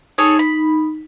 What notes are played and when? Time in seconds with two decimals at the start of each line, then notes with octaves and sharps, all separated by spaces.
0.18 D#4 G#4 A4 C#5
0.39 B5